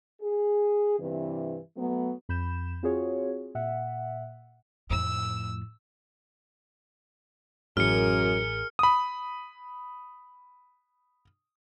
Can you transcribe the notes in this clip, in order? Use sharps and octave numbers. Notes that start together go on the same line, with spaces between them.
G#4
G2 C3 E3
F#3 A3 B3
F2 B5 G6 E7
C4 F4 F#4 G#4 C#5
A#2 E5 F#5
F2 A2 E6
A1 F#2 A2 G#4 A#4 F6 C#7
B5 D#6